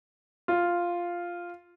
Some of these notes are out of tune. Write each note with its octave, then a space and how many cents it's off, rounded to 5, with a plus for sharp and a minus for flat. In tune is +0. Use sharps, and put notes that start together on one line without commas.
F4 +0